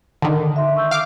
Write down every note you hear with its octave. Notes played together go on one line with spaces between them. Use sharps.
D3 D#3
E5 C6
C#6 E6 G6
F5 D6